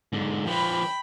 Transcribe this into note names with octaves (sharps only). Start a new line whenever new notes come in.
G#2 D3
F3 B4 G5 B5